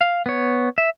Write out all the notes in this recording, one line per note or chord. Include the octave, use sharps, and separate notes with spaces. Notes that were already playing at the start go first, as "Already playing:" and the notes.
F5
B3 C#5
E5